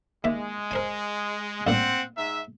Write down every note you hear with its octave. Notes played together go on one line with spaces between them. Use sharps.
D#2 G#3 E5
A#4 C5 G#5
A1 G2 A#2 C4 F#5
G#2 E5